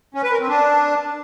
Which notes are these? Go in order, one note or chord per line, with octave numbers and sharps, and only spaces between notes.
C#4
B4
A#4
C4
D4